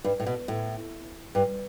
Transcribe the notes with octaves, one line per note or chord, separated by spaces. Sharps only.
G2
A2
B2
A2
G2